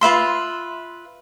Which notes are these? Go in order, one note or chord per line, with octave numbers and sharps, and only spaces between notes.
F4 B4 E5 C6